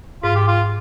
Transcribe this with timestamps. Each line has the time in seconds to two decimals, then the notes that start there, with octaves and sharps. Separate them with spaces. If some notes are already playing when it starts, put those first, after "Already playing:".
0.23 G#2 F4
0.35 G4
0.48 F4